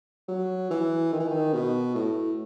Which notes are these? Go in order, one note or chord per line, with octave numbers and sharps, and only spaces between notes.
F#3
E3
D#3
E3
D#3
B2
A2